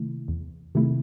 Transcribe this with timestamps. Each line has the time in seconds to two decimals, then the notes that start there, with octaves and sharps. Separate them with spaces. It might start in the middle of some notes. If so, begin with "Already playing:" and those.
Already playing: C3 D#3 A3 E4
0.28 E2
0.75 C3 D#3 A3 E4